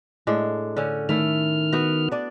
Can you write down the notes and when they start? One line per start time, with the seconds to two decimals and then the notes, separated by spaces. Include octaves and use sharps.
0.27 A2 G#3 D4
0.77 D3 C#4
1.09 D#3 A3 E4 F6
1.72 B3 F#4
2.12 D4 D5